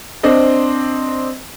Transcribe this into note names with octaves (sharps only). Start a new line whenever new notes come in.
C4 D4 C5 D#5